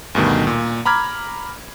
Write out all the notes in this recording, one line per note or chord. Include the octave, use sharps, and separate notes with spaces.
D2 G2 B2 D#3
A#2
A#5 B5 D6 F6 G#6